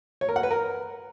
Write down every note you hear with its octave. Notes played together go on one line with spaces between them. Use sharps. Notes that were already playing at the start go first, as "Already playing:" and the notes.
C#5
A#4
F#5
B4
A#4